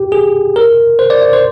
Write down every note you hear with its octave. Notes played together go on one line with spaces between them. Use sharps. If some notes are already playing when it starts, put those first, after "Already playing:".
Already playing: G4
G#4
A#4
C5
D5
D5
C5